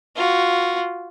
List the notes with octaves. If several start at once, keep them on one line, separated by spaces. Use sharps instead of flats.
F4 F#4